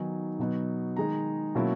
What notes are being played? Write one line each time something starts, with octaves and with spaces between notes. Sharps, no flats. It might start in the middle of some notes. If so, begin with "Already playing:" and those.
Already playing: D#3 F#3 B3 D#4 G#5
B2 F#3 B3 D#4
D#3 G#3 D#4 A#5
B2 F#3 A#3 C#4 E4